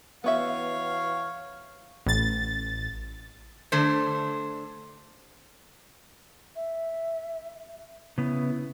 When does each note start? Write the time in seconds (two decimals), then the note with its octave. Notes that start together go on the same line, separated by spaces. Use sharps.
0.24 E3 B3 F#4 C#5 E5 F5
2.06 A1 A6
3.72 D3 A3 D4 A4 C5
6.56 E5
8.18 C#3 B3 E4